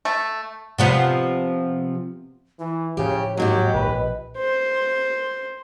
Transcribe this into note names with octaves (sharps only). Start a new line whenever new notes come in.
A3
C3 F3 B3
E3 E4
A2 C#3 F3 G4 C#5
D#2 G#2 F#3 G4 D#5
A#1 B4
C5